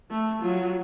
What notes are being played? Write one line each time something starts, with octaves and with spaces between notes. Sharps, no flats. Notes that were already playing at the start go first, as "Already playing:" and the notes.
A3
F#3 F4